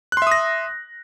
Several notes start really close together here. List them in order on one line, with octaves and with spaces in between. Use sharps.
F#6 C6 E5 D#6 A#6